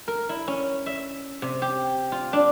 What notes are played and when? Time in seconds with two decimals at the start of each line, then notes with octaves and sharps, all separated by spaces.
0.08 A#4
0.29 E4
0.48 C#4
0.86 E5
1.42 C3
1.62 G4
2.12 F4
2.33 D4